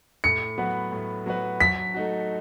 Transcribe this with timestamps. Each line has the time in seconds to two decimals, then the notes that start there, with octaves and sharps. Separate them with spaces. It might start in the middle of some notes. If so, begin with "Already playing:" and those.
0.24 A2 C#7
0.58 F#3 B3 F#4 B4
0.92 A2
1.26 F#3 B3 F#4 B4
1.60 F#3 B6
1.94 A3 D#4 F#4